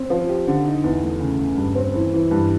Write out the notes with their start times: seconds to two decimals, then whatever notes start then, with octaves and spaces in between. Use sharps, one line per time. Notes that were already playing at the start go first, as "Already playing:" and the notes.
Already playing: C4
0.10 F3
0.29 G4
0.47 D3
0.66 D#4
0.84 E2
1.03 A3
1.20 C#3
1.39 C#3
1.57 G2
1.75 C4
1.95 E3
2.13 E3
2.31 G2